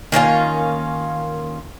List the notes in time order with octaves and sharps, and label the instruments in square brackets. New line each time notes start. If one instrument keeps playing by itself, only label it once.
[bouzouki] D#3 A#3 C#4 F4